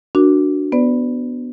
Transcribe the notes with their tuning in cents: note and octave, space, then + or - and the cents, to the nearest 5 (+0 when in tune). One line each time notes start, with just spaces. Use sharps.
D4 +0 F#4 +0 A#4 +5
B3 +0 B4 +45 D5 +0